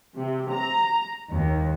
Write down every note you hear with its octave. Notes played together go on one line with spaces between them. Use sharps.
C3
A#5
D#2